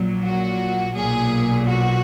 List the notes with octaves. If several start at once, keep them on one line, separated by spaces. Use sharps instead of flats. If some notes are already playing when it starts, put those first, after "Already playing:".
Already playing: A#1 A#2 F#3
F#4
B1 A#2 F#3 G#4
F#4